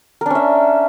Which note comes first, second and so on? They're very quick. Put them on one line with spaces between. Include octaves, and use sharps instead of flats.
A#4 D4 C#4 E5